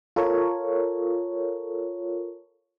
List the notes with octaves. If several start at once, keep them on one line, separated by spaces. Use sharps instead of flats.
F4 A4 A#4 C#5